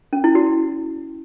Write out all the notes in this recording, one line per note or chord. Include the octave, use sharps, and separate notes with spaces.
C#4
E4
F#4